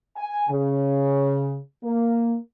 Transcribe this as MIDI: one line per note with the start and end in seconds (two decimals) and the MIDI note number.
0.17 0.45 80
0.49 1.57 49
1.84 2.36 58